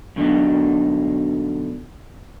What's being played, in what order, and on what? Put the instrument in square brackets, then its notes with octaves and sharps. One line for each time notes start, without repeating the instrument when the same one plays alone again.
[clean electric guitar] G2 B2 D3 F#3 D4 D#4